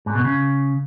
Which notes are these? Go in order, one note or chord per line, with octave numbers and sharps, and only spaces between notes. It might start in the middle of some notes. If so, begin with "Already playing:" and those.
G#2
B2
C#3